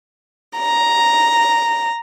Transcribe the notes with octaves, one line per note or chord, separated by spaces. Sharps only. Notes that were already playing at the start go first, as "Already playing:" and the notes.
A#5